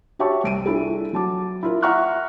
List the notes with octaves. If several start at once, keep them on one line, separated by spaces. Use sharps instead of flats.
F#4 G4 C#5 E5 A5 C#6
C2 D7 D#7
D4 E4 F4 G#4 A4
F#3 A5 D6
E4 F4 A#4
E5 F#5 A#5 C#6 F6 F#6